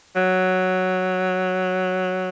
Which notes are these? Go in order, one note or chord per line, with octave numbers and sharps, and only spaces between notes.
F#3